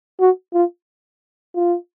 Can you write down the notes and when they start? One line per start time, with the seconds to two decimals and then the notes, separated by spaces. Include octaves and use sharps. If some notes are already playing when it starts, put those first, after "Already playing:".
0.20 F#4
0.54 F4
1.55 F4